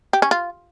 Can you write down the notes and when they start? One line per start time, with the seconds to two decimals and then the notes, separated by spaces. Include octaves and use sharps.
0.13 G4
0.22 C#4
0.31 F4